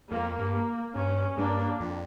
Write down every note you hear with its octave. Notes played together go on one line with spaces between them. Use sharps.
F2 A#3
G2
A#3
G2 C#4
G2 A#3 D4
F2